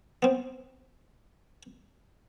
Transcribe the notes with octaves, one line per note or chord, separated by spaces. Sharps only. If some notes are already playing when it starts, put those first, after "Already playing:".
B3 C4